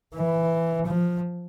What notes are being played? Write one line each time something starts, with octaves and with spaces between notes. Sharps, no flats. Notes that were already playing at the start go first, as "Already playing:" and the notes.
E3
F3